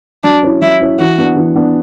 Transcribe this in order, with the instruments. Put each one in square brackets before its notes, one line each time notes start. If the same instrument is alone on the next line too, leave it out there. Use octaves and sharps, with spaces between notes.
[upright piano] F#3 [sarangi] D4
[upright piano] C#4 E4
[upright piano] F#3 [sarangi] E4
[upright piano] C#4 E4
[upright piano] E3 [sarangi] F#4
[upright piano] B3 D4
E3
B3 D4